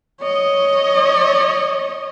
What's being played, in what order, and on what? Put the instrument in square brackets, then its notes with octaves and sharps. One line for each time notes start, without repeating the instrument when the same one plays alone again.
[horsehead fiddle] C#5 D#5